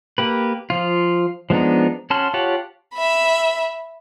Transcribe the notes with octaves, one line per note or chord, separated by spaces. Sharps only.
A#3 G4 B4
F3 F4
F3 G#3 B3 D4 D#4
C#4 F#4 A5 C6 F6
F4 G4 C#5 F#5 A5
E5 B5